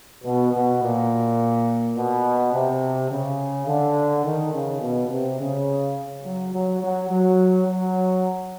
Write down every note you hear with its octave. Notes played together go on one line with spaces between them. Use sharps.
B2
B2
A#2
B2
C3
C#3
D3
D#3
C#3
B2
C3
C#3
F#3
F#3
F#3
F#3
F#3